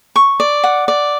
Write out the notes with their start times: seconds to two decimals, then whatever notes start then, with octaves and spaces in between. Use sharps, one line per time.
0.16 C#6
0.40 D5
0.64 F#5
0.88 D5